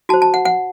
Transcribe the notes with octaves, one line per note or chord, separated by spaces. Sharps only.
F#4 C5 A5
A5
F#5
F#5